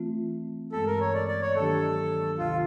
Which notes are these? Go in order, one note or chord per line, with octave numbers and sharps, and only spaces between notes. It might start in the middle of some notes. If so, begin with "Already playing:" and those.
Already playing: E3 A3 C4 F4
G2 E3 G#3 B3 A4
A#4
C#5
D5
D5
C#5
D#3 F#3 A#3 D4 G4 A4
D2 C3 D#3 F4